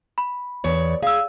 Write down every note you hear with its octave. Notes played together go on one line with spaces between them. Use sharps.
B5
E2 C#5 D5
G#4 F5 E6